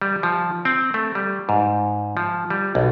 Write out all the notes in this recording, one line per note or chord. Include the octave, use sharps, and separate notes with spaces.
G3
F3
C4
A3
G3
G#2
F3
G3
B1